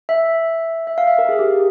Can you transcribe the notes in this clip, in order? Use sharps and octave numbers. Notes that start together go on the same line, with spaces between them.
E5
E5
F5
E5
A#4
G#4
G4